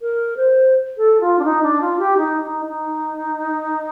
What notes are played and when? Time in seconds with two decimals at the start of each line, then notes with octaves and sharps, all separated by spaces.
0.02 A#4
0.37 C5
0.97 A4
1.20 F4
1.39 D4
1.44 D#4
1.63 D4
1.81 F4
1.99 G4
2.18 D#4
2.42 D#4
2.65 D#4